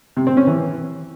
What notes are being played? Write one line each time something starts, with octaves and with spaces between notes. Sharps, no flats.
C3
C4
C#4
E3